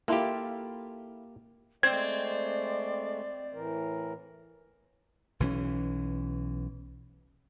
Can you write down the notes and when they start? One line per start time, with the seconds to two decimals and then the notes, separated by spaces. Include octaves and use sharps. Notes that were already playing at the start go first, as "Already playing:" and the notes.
0.08 A#3 E4 F4 G4 A4
1.83 G#3 A3 C4 D5 G#6
3.53 A2 E3 A#4
5.40 B1 E3 F3 C#4